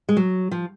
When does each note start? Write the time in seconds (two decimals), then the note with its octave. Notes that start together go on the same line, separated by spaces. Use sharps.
0.09 G#3
0.17 F#3
0.51 F3